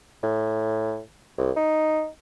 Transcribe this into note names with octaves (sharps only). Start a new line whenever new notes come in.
A2
C2
D#4